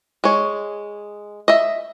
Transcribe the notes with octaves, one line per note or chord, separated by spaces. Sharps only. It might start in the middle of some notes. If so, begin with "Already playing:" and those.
G#3 C#5
D#5 E5